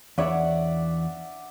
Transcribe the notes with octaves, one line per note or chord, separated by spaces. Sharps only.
E2 C#5 D5 E5 F#5